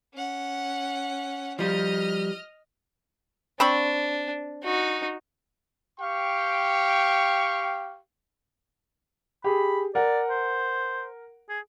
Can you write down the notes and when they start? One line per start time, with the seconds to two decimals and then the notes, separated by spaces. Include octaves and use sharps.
0.14 C#4 F#5
1.59 F3 G3 D#5 F6
3.60 C4 D4 B5 C#6
4.63 D#4 F#4
6.00 G4 F5 G5 C#6
9.44 G4 G#4 B5
9.95 A#4 D5 F#5
10.30 C5
11.49 G#4